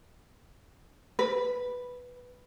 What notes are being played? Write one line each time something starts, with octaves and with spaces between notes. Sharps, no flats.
B4